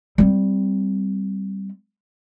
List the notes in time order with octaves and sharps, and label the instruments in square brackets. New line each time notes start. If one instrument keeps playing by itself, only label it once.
[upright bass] G3 C4